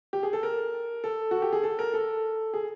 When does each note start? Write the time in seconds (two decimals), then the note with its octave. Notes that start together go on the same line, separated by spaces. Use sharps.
0.13 G4
0.23 G#4
0.33 A4
0.43 A#4
1.04 A4
1.31 F#4
1.42 G4
1.53 G#4
1.63 A4
1.79 A#4
1.94 A4
2.54 G#4